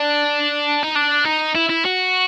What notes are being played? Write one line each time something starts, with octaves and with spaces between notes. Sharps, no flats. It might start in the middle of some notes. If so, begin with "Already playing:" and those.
Already playing: D4
D#4
D4
D#4
E4
E4
F#4